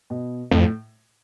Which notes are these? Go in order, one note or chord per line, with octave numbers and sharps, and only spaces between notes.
B2
F2 A2